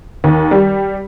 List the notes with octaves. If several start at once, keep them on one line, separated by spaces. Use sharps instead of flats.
D#2
G3